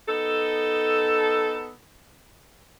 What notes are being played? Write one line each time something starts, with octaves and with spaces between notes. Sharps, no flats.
B3 D#4 A4